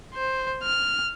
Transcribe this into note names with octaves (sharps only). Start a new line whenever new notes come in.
C5
F6